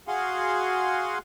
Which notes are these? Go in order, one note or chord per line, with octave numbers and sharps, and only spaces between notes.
F#4 G#4 F5 F#5 G#5 C6